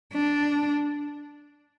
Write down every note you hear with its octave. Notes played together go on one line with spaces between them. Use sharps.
D4